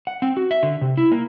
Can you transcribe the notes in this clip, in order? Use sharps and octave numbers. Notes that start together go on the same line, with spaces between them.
F#5
C4
F#4
E5
D3
C3
E4
A#3